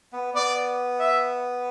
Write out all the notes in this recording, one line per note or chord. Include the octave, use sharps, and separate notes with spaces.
B3
B3 D5
E5